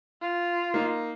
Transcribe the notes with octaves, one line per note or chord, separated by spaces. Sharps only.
F4
A#3 D#4